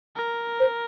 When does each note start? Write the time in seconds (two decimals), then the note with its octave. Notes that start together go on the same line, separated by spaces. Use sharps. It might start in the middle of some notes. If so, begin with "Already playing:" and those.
0.16 A#4
0.60 C5